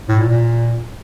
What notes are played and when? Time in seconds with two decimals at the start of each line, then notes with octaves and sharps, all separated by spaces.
0.09 A2
0.19 A#2
0.30 A#2